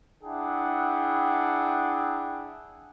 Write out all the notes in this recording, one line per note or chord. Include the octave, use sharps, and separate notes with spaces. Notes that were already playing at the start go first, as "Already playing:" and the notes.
D4 E4 G#4 E5 F#5 G5